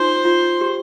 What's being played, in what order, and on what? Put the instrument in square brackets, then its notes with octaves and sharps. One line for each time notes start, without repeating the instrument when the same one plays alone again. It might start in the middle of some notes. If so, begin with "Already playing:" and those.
Already playing: [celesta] D#4 F4 [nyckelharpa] C5
[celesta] F4
G4